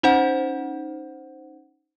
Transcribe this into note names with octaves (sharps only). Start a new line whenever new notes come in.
C#4 D#4 C5 F#5